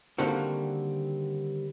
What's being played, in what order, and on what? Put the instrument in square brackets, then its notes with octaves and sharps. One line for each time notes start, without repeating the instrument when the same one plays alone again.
[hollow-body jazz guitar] D3 D#3 G3 A#3 C4 F#4